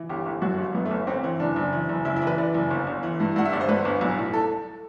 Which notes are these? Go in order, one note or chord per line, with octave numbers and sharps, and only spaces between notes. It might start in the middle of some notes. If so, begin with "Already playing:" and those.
Already playing: E3
G1 G4
G1
F#2 F#4
G1
F#2 B3
A3
G1
G1 C4
E3
F#1 D4
F#1
E3
F#1
F#1 E4
E4
E3
B4
E3 D5
F#1
G1
G1
E3
G2
G2 F#5
E5
G1 D5
C5
G2 B4
G1
B1
A2
A4